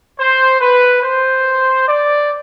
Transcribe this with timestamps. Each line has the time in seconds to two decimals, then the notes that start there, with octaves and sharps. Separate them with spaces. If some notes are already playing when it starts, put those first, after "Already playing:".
0.19 C5
0.61 B4
1.03 C5
1.87 D5